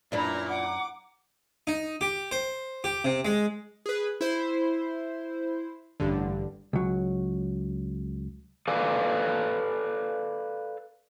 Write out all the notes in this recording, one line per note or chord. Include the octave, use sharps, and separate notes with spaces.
F#2 A#2 D4 E4 B4 A#5
F#5 D6
D#4
G4
C5
G4
C3
G#3
G#4 B4
E4 C5
A1 G2 D3
C#2 F#3
A4 B4 D5 F5 G#5